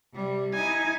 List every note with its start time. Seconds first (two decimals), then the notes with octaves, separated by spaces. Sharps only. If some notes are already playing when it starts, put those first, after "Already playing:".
0.14 C3 G3
0.54 D#4 E4 G#5